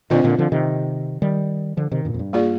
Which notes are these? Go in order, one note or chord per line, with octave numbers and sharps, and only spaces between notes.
A#2 D3 C4 F4 C5 D#5
A#2 D3
D3 F3
C3 D#3
D#3 G3
D3 F3
C3 D#3
G2 A#2
F2
G2
A#3 F4 G#4 D5